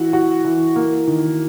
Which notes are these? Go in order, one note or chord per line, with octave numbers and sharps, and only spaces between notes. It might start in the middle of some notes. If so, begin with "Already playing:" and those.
Already playing: E3 F#4
F#4
E3
A#3
D#3